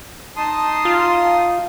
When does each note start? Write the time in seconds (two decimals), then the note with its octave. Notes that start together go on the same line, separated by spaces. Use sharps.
0.37 D#4 A5 C6 D#6
0.85 F4